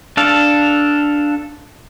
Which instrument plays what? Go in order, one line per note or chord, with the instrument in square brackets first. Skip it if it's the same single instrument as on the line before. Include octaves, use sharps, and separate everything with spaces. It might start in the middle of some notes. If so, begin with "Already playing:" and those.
[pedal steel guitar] D4 A4 F5